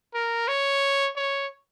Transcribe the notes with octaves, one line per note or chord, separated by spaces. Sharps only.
A#4
C#5
C#5